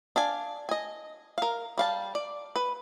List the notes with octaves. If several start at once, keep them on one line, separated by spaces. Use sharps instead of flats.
D4 F5 G#5
D#5 G#5
A#4 F5
G3 F5 A5
D5
B4